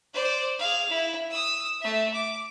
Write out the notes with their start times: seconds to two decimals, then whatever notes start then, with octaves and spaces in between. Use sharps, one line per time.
0.14 C5 D5
0.59 G#4 F5
0.89 E4
1.30 D#6 E6
1.81 A3 E5
2.13 D6